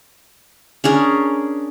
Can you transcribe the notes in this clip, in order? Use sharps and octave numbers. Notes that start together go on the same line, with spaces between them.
C#4 D4 G#4 A#4